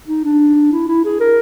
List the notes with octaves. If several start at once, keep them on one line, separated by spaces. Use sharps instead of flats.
D#4
D4
E4
E4
G#4
A#4